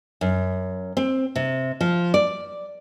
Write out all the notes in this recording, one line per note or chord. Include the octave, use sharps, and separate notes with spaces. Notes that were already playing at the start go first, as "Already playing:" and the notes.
F#2
C4
C3
F3
D5